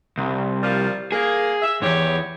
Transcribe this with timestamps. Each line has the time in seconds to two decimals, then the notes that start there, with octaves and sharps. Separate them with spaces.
0.18 C2
0.63 F3 G3 A#3
1.12 A#3 G#4
1.61 E5
1.82 E2 G#2 G4 C#5